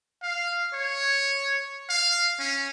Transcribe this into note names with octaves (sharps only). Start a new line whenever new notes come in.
F5
C#5
F5
C#4